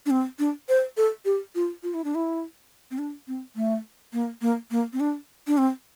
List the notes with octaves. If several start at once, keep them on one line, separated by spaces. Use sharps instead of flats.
D4
C4
D4
C5
A4
G4
F4
F4
E4
D4
E4
C4
D4
C4
A3
A#3
A#3
A#3
C4
D4
D4
C4